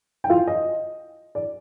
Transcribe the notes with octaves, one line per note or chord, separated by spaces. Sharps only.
G5
F4 F5
D#5
D5